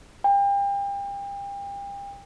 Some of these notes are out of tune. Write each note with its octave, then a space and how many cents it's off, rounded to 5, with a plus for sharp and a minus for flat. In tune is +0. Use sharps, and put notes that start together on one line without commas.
G5 +35